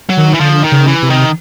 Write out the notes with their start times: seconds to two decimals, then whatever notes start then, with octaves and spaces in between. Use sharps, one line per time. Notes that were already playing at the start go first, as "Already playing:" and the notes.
0.10 F#3
0.17 D#3
0.34 E3
0.40 D3 F3
0.64 D#3
0.72 C#3
0.87 E3
1.02 C3
1.10 D#3